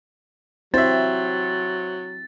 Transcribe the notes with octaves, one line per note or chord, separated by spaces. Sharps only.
F#3 C4 E4 G4 C5 E5 A6